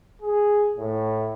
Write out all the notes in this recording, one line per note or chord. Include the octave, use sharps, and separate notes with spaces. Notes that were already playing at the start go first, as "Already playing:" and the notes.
G#4
A2